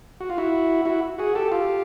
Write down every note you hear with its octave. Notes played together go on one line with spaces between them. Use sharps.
F#4
F4
E4 F#4
E4 F#4
F#4 G#4
G4 A4
F4 G4